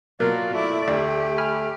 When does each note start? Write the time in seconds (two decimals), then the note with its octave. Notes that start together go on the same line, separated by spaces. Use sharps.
0.20 B2 F#3 A#3 F4 D5 F5
0.53 A3 E4 D5
0.88 D2 G4 D5
1.38 G#5 B5 F6